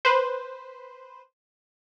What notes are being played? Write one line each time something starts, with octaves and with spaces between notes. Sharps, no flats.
B4 C5